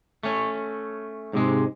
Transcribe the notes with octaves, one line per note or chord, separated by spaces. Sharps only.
A3 C#4
G#2 C3 G#3